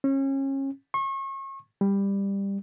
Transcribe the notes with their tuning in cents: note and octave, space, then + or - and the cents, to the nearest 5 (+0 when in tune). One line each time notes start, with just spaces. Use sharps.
C#4 -30
C#6 -35
G3 +15